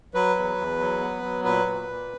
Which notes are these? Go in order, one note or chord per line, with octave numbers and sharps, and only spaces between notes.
F#3 B4
E2
E2
F#3
B3
F#3
A#2 B4
A#2
A#2